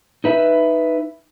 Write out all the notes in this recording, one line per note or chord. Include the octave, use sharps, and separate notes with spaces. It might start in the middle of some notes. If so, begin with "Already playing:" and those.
D#4 B4 E5